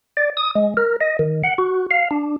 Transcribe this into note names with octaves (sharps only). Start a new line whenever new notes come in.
D5
D#6
G#3
A#4
D#5
D#3
F#5
F#4
F5
D4